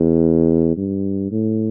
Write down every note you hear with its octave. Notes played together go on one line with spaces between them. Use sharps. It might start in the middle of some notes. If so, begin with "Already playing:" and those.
Already playing: E2
G2
A2